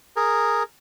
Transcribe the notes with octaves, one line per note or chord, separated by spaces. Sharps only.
G#4 A#4